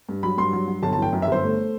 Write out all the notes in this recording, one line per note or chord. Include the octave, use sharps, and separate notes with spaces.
G2
F#3 B5
G2 C6
F#3
F#3
G1 A5
A5
E3 G5
F#2
E5
G1 C5
A3